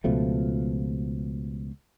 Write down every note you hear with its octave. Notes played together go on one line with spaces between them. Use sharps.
C#2 B2 F3 A3